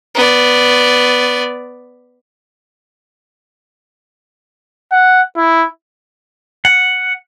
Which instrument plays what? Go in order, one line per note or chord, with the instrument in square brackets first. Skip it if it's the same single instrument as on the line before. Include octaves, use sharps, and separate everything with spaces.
[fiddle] B3 D5
[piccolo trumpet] F#5
E4
[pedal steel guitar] F#5